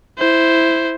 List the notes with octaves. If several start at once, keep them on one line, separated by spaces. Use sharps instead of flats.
E4 C5